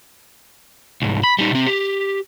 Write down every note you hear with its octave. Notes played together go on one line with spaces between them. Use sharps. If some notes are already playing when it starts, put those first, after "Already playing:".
C2 G#2
B5
G3 D#4
C3 C4
G4